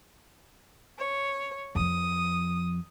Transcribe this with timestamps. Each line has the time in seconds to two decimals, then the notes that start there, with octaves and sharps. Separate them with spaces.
0.98 C#5
1.75 F2 F3 D#6